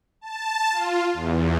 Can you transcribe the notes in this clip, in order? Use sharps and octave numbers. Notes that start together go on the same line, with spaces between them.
A5
F4
E2